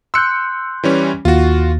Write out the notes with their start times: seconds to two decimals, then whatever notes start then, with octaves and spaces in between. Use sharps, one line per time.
0.14 C6 E6 F#6 G6 C#7
0.84 E3 G3 C#4
1.25 D#2 F4 F#4